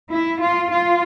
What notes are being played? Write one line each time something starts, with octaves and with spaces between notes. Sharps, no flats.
E4
F4
F4